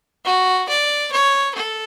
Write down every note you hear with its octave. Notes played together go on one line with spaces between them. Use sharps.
F#4
D5
C#5
A4